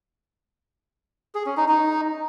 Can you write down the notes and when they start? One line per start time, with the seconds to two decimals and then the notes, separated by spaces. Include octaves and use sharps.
1.35 G#4
1.46 C#4
1.57 D#4
1.68 D#4